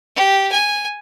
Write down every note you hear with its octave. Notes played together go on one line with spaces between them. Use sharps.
G4
G#5